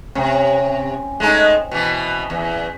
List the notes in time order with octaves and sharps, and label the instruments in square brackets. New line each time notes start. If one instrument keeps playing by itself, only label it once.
[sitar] C3 [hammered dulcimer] C4 C#4
[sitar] G#3 A3 D#4
B2 E3
E2